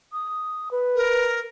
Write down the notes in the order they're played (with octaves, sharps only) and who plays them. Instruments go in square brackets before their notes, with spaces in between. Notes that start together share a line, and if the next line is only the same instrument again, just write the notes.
[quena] D#6
B4
[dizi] A#4